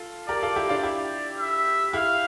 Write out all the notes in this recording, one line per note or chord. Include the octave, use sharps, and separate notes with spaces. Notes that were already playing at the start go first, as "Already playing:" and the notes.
Already playing: F4 A4
G4 A#4 D5
F4 A4
E4 G4
D4 F4
E4 G4 D5
E5
E4 G4 F5